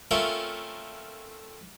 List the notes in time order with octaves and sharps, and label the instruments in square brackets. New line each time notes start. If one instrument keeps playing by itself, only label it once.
[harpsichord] A3 C4 C#4 F4 A#4 E5